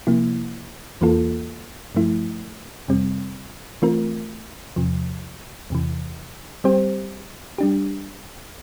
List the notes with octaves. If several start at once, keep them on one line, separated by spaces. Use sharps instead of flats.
C3 F3 A#3 E4
E2 E3 A#3 F4 A4
G2 F3 A3 E4
F2 C3 G3 C4
E3 A3 C4 F4 A#4
E2 C3 F3
E2 C3 E3
G3 C4 G4 C5
G3 D4 G4